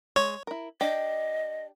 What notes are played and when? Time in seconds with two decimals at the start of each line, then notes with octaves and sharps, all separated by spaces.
0.16 G#3 C#5
0.47 E4 A#4
0.81 D4 G4 D#5 G5